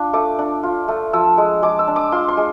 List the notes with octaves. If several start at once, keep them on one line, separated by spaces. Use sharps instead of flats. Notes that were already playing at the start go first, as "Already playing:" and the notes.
Already playing: D4 F4
A3 D6
D4
F4
A3
F3 E6
G#3
G#3 D6
E6
D4
D6
F4 C6
C6
G#3